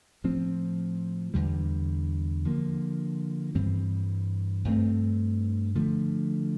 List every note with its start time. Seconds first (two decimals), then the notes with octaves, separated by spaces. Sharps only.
0.24 A2 F3 C4
1.34 E2 D3 G3
2.45 D3 F3 A#3
3.55 G2 E3 G3 C4
4.65 G2 F3 A3 C4
5.75 D3 F3 A3